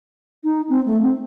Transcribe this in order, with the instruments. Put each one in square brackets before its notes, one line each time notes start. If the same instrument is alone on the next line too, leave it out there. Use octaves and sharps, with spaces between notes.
[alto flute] D#4
C4
A3
C4